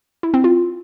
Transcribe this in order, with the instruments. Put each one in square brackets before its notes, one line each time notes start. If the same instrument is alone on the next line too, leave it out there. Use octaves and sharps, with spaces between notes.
[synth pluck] E4
C4
F4